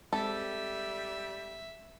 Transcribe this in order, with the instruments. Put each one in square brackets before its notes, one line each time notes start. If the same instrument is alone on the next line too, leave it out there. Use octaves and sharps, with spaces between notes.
[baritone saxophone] G3 [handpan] G#3 C4 [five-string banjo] A4 [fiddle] E5